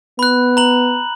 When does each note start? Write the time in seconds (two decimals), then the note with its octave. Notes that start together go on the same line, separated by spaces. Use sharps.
0.19 B3 B5 F#6
0.57 A#5 F#7